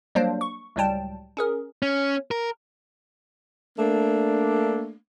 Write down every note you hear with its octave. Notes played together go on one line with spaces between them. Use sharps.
F#3 G3 A#3 D4 C5
C#6
C#2 A2 F#3 G3 G5 A5
C#4 G#4 A#4
C#4
A#4
A3 A#3 D4